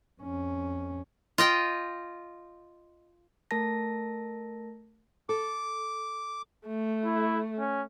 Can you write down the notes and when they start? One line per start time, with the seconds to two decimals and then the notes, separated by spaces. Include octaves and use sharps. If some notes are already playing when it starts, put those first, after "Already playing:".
0.21 F2 C#4
1.38 F4 D#5 G5
3.51 A3 A#4 A5 A#6
5.29 A4 D6
6.67 A3
7.04 E4
7.58 C#4